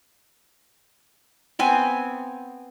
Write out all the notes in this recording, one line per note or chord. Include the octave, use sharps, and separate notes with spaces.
B3 C4 G#5